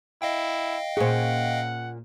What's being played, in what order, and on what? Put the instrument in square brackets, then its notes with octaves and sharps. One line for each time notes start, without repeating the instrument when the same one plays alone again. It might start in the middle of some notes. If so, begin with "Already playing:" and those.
[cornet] E4 [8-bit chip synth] D#5 F5 G5
[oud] A#2 C#4 [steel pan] G#4 C5 [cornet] F#5